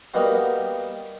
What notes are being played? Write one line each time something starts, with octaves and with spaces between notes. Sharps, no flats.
G3 A#3 B3 D#4 F#4